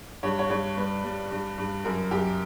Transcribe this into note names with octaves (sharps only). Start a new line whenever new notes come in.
G2 C#5
C#5
G2 C#5
G3 B4
G3
G2
G2
F#2 A#4
F#2 G4